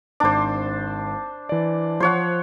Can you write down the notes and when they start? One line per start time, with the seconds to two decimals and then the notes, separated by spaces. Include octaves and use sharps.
0.20 G#1 D4 C5 D6
1.49 E3 D5
2.00 F3 C5 C#5 F#5